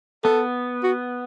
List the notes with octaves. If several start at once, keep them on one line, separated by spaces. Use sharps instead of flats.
B3 A4
F#4